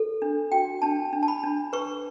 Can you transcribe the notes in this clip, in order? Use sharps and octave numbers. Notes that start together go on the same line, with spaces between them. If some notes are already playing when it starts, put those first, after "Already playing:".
Already playing: A4
D4
F#4 G5
D4 A5
D4
A5
B5
D4
B4 C#6